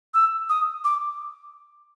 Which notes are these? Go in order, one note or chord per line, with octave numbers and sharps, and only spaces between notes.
E6
D#6
D6